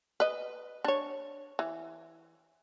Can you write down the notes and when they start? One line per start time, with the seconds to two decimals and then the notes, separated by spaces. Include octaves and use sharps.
0.20 B4 D#5
0.85 D4 C#5
1.59 E3